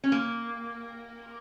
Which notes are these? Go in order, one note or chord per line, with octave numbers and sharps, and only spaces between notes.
C#4
A#3